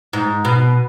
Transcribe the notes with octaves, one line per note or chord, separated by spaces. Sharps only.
G#2
B2